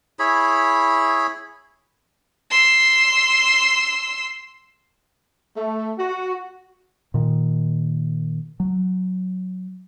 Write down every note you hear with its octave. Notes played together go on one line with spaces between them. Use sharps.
E4 G#4 C#5 B5
C6 E6
A3
F#4
A#2 D#3
F#3